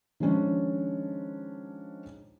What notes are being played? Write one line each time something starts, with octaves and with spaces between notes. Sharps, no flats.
D#3 F3 G#3 C#4 D4